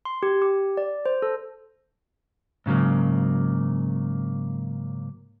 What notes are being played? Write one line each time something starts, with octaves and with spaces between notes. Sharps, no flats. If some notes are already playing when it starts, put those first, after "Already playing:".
C6
G4
G4
D5
C5
A4
G#2 C#3 F#3 A#3